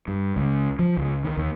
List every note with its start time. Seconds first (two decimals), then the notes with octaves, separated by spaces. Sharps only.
0.08 G2
0.36 C#2
0.79 F3
0.97 C#2
1.24 D#3
1.37 D#2